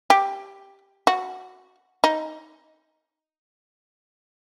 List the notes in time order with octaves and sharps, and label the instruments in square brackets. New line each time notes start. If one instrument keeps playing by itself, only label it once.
[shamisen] G4
F#4
D#4